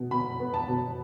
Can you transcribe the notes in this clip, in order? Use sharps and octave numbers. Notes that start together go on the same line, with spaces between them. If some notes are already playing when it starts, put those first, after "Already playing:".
Already playing: B2
B2 B5
B3
A5
B2